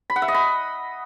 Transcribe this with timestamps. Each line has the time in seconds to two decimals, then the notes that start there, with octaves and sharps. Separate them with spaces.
0.10 B5
0.16 F#5
0.22 E5
0.28 D#5
0.34 B5